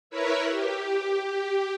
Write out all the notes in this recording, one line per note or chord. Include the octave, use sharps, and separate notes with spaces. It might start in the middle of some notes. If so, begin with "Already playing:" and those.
E4 A#4 B4 C#5 E5
G4
G4